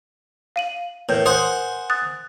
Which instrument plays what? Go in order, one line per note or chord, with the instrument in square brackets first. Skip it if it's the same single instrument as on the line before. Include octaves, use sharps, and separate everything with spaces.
[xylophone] F5 D#7 F#7
[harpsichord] A2 [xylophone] A#4 B4 G6
[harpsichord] G#4 C5 F#5 [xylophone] D#6
[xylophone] D#6 F#6 A6